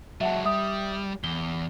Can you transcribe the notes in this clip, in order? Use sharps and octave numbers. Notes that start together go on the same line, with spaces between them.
F#3 G#3 E5 F#5 A5
G3 E5 D#6
E2 G7